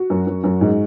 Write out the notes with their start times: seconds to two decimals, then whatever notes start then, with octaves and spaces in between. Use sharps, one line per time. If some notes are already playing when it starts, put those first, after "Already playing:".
Already playing: F#4
0.10 F#2
0.27 F#2
0.44 F#2
0.61 G#2